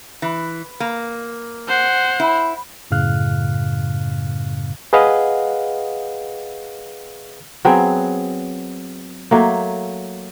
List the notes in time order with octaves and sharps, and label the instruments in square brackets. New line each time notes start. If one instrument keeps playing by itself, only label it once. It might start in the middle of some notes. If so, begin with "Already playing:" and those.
[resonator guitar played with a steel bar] E3
A#3
[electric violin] C5 F#5
[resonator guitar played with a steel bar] E4
[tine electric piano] F#2 A2 C#3 F5 F6 F#6
[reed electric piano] G#4 B4 D#5 F5 F#5
[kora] F#3 B3 C4 G#4
F#3 A3 A#3